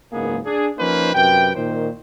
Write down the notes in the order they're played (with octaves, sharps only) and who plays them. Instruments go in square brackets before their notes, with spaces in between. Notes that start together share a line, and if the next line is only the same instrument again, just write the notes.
[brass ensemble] F#1 C#2 G#2 A#3 B3 G#4
D4 G#4
F3 A#3 C#4 D#4 B4 C5
F#2 C3 B4 G5
A#2 D#3 C5